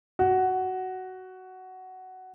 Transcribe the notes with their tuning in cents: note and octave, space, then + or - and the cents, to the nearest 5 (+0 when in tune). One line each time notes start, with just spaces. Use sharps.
F#4 +10